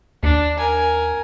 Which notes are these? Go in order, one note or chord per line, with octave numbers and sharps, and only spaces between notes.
D#2 D4
A#4 G#5